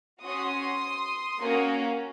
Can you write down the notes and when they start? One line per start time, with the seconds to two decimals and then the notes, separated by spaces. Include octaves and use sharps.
0.23 C#4 F#4 C6 D#6
1.41 A#3 C#4 F#4